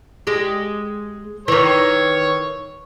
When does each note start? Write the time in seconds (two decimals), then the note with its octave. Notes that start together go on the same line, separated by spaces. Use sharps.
0.27 G#3 G4
1.48 D#3 E3 C#5